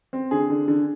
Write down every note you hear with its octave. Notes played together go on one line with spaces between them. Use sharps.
C4
D3 G#4
D3
D3